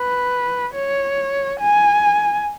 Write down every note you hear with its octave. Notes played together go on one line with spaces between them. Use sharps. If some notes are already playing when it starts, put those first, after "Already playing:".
Already playing: B4
C#5
G#5